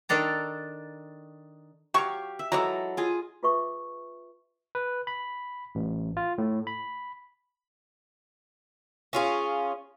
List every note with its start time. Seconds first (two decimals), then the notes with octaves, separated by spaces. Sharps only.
0.09 D#3 D4 A4 A#5
1.94 F#3 G4 F5 C#6
2.39 E5
2.52 E3 F#3 G#3 E4 A4 A#5
2.97 F4 G#4 D#5
3.43 F4 G#4 B4 E5 C#6 D#6
4.75 B4
5.07 B5
5.75 A1
6.17 F4
6.38 A2
6.67 B5
9.13 C#4 F4 G#4